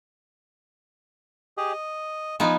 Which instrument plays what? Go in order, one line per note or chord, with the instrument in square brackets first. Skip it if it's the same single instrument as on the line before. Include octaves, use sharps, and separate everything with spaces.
[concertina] G4 G#4 D#5
D#5
[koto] F3 B3 D#4 [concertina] G#5